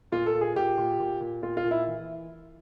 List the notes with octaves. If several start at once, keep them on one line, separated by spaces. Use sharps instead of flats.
A#2 F4
A4
A#2
G#4
A#2 G4
A#2
A#2
A#2
A#2 F4
F4
A#2
E4
E3